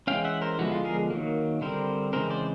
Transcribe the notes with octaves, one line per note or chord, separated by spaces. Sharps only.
E3 G#3 C#4 F5 G5
E5 F#5
A#4 C5
D3 F3 G#3 B3 E4 F#4
F4
G#4 A#4
D#3 F#3 A#3
D3 G3 C4 A#4 C5
C#3 E3 G#3 C4 A#4 C5
C5 D5